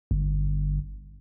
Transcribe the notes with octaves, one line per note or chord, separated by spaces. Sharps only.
G1